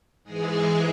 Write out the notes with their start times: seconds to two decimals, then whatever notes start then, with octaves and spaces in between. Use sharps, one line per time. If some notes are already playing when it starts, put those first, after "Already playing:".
0.23 G#2 E3 G#3 G#4